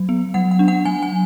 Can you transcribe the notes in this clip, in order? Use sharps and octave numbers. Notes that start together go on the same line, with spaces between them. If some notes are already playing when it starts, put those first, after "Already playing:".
Already playing: F#3
B3
F#3 F#5
F#5
D4
F#5
F#3 G#5
G#5